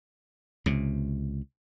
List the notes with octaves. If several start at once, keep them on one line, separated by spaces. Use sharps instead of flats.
C#2 C3